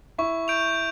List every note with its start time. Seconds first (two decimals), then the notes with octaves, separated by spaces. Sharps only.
0.18 E4 C#6
0.48 G6 D7 F7